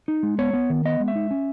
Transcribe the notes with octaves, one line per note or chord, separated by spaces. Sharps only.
D#4
G#3
B3 C#5
B3
D#3
B3 D#5
G#3
E5
D#4
C#4